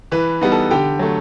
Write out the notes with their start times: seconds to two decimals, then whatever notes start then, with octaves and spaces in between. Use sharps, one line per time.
0.12 E3 B4 B5
0.41 G3 B3 D#4
0.52 A4 A5
0.71 D3 G4 G5
0.99 F#3 A3